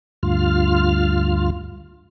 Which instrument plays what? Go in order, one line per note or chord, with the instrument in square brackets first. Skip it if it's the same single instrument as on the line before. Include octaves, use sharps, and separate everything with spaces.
[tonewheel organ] D2 G2 F4 F6